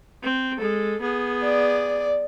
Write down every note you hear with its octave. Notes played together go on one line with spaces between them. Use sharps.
C4
G#3 A4
B3 G#4
D5